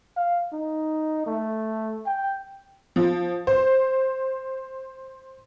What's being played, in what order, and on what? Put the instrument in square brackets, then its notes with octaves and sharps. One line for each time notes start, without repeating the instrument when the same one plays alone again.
[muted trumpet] F5
D#4
A3
G5
[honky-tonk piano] F3
C5